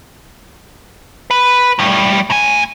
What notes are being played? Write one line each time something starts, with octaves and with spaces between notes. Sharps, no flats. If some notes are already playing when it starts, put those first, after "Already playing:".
B4
A2 G3
A2 G#5